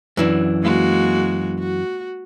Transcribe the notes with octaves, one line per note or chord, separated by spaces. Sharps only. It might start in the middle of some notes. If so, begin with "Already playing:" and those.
F#2 E3 D4
G#3 A#3 F#4
F#4